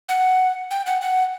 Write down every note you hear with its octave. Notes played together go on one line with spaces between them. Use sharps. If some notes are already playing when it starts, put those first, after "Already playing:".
F#5
G5
F#5
F#5